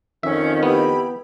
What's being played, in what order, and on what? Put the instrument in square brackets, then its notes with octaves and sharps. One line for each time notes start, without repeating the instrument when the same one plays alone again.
[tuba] F2 [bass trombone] D#3 [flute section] C#4 [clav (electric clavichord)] E5
[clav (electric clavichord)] B3 [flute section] E4 G4 B5